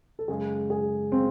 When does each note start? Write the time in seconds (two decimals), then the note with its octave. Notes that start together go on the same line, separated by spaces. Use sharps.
0.19 A4
0.28 F#2 C#3 G#3 G#4
0.70 G#4
1.12 C#3 C4